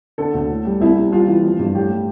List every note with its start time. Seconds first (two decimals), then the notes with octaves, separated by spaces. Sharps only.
0.18 D3 A4
0.34 D2
0.49 A2
0.65 G3
0.80 C2 E4
0.96 C3
1.12 G3 F4
1.27 E3
1.43 F3
1.59 G2
1.74 A2 G4
1.91 G3